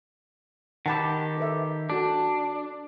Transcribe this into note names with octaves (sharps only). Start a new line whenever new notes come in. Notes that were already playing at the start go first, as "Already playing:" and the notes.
D#3 G4 F#5 A5 B5
A4 B4 E5
D4 F#4 A4